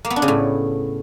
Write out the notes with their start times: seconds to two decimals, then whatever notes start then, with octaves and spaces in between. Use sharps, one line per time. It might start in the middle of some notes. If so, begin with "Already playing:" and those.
0.05 A#3
0.10 B3
0.16 D4
0.22 C#3
0.28 A2